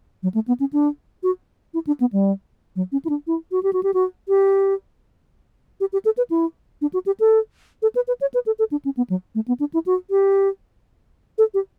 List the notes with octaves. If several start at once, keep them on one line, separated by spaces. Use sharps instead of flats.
F#3
A3
B3
C#4
D4
F#4
E4
D4
B3
G3
F#3
C#4
E4
D4
E4
F#4
G4
F#4
G4
F#4
G4
G4
G4
A4
B4
E4
D4
F#4
G4
A4
A4
B4
B4
C#5
B4
A4
A4
D4
C#4
B3
F#3
A3
B3
D4
E4
F#4
G4
A4
G4